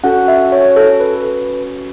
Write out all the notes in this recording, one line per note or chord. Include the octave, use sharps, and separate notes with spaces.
C#4 F#4 A4 F#5
E5
C#5
A4
B4
B4